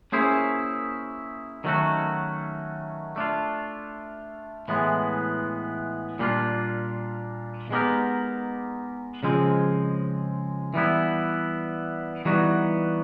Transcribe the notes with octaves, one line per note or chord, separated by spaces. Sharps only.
A#3 C#4 E4 G#4 C5
D#3 F#3 A3 C#4 F#4
A3 D4 F4
A2 E3 G#3 B3
A#2 G3 A#3 D4 F4
G#3 B3 D#4 G4 A#4
C#3 F3 G#3 C4
E3 G3 B3 E4
E3 G3 B3 D#4 F#4